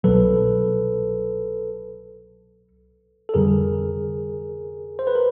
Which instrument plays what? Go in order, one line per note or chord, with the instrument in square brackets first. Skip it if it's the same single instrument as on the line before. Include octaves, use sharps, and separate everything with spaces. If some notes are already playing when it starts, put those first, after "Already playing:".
[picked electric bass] C2 B2 F#3 [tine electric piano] A4 B4
[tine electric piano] A4
[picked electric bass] F1 F2 D3 G3 [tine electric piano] G#4 A#4
[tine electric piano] C5
B4
A#4